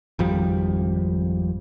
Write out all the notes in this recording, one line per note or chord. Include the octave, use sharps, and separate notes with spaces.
G#1 F2 F3 G3